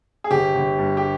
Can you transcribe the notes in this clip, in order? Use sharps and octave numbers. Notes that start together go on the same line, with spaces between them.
G#4
G1 G4
G1
G2
G4